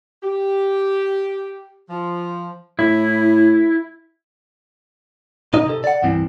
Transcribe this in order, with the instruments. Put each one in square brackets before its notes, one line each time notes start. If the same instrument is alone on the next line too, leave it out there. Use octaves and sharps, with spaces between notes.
[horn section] G4
F3
[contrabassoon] A2 [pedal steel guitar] E4
[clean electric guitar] A#2 D#4 D#5
C3 A4
D5 F#5
C2 G2 E3 C4